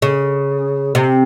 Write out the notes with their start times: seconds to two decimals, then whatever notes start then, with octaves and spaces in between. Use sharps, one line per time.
0.02 C#3
0.95 C3